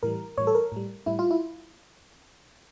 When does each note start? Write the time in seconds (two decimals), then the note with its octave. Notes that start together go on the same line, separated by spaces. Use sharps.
0.03 A2 E3 G3 A#4
0.38 A2 E3 G3 C#5
0.47 A4
0.55 A#4
0.72 A2 G3
1.06 A2 G3 E4
1.19 F4
1.31 E4